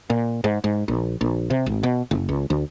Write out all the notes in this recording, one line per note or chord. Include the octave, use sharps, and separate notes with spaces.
A#2
G#2
G#2
A#1
A#1
C3
G#1
B2
F#1
C#2
D2